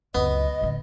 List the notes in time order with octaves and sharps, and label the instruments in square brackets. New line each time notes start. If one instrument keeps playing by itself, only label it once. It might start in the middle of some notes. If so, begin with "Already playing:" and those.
[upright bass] C#2 F#2 [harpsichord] B3 [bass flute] D#5
[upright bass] A2 D3